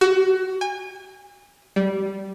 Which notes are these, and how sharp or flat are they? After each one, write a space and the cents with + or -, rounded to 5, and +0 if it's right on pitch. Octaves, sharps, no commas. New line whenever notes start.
F#4 +25
G#5 -35
G3 -15